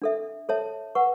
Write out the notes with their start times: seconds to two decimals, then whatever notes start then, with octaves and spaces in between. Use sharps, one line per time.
0.02 D4 A4 E5
0.49 A4 C#5 E5 A5
0.95 B4 F#5 C#6